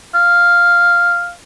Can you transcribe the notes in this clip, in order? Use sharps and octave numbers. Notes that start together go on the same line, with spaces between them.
F5